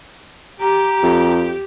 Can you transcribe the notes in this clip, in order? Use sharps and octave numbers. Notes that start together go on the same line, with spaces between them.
G4 A#5
F2